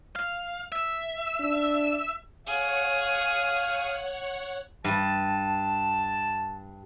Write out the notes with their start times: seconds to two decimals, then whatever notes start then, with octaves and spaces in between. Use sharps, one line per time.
0.16 F5
0.72 E5
1.40 D4
2.47 G#4 C#5 F5 F#5
4.84 G2 A5